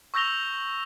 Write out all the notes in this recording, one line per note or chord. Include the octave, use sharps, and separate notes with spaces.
C#6 E6 G6 A#6 F7 G7